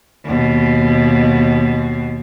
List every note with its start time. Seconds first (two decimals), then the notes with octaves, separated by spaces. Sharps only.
0.25 D#2 B2